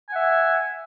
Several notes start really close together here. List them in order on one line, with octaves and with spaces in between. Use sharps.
G#5 F#5 E5